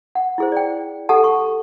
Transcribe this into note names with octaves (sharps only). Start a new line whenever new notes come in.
F#5
E4 G#4 C5
D5 G5
G4 A4 F#5 A5
C#6